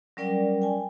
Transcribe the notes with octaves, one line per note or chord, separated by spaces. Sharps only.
F#3 G3 C#4 A#4 D5 G5
G5 G#5